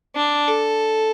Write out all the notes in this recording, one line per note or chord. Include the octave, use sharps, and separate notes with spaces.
D4
A4